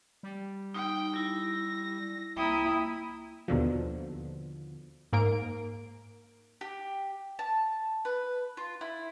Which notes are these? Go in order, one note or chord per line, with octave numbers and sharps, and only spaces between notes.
G3
D#4 G5
E4 A#6
C2 A#3 E4 G5 D#6
D#2 B2 D3 F3
G#2 A#3 A#4 D7
G4
A5
B4
F4
E4